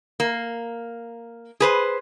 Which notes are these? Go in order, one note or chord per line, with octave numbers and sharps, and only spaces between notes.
A#3
G#4 B4 C5